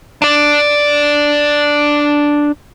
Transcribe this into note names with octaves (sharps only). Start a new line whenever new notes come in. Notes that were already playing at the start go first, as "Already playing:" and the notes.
D4 D5